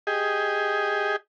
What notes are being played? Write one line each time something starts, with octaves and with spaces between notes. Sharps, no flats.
G4 G#4 D#5